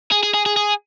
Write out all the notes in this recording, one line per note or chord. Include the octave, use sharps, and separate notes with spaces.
G#4
G#4
G#4
G#4
G#4